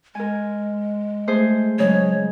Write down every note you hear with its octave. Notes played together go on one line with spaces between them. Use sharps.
G#3 A#4 G#5
A3 G#4 C5
C#3 F#3 G#3 C#5